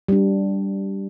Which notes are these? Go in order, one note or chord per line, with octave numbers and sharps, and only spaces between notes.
G3 D4